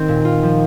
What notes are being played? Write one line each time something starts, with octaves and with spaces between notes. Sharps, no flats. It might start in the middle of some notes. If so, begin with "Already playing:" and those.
Already playing: D#3 C4
A#2
F4
F3